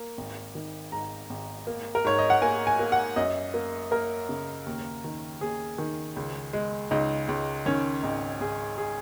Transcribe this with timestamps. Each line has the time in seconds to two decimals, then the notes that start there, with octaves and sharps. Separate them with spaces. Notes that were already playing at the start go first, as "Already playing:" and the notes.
Already playing: A#3
0.17 G#1
0.55 D#3
0.92 G#2 A#5
1.30 G#1
1.67 A#3
1.95 A#4
2.04 G#2 C#5
2.19 D#5
2.30 F#5
2.42 A#3 G#5
2.67 G#5
2.79 A#3
2.92 F#5
3.16 F#2 D#5
3.54 A#3
3.91 A#3 A#4
4.29 C#3
4.66 D#2
5.04 D#3
5.41 D#2 G#4
5.78 D#3
6.16 C#2
6.53 G#3
6.91 C#2 D#4
7.28 C#2
7.66 D#3 C#4
8.03 G#1 D#4
8.40 G#1 G#4
8.78 G#4